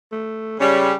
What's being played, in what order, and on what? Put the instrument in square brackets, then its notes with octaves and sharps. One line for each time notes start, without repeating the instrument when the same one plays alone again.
[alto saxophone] A3
[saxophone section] C#3 G3 [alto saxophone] C#4